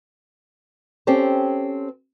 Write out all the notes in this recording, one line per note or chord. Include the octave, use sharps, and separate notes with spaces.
C4 C#4 G4 A4 C5